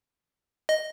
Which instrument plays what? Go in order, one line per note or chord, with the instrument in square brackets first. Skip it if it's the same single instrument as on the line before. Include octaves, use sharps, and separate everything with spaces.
[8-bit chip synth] D#5